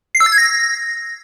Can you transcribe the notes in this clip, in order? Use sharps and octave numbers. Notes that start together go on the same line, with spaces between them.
C7
E6
A6
G#6
A#6